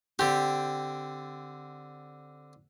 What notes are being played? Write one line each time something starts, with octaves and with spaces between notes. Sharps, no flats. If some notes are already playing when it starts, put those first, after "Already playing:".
D3 C4 G4